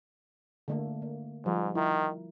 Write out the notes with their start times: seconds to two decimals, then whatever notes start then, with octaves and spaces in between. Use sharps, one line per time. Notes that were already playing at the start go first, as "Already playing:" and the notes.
0.68 D3 A3 A#3
1.02 A#3
1.46 G#2 F3 G3
1.75 D#3 E4 A#4